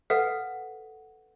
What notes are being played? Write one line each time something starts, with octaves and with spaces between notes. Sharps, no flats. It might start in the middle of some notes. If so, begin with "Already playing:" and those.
A4 B4 F5 F#5